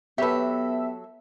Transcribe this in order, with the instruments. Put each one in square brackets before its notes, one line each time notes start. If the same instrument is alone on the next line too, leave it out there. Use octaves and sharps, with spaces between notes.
[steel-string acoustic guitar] F#3 A4 [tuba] B3 [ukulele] G4 B4 [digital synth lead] E5